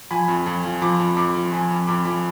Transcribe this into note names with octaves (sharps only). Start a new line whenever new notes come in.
F3 G#5 B5
F2
F2
F3
F3 B5 D6
F2
F2 B5 D6
F3
F3 G#5 B5
F2
F2 B5 D6
F3 B5 D6